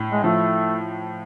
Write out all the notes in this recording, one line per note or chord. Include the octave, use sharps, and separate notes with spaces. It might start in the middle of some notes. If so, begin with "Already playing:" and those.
Already playing: A2
G#3
F3 A3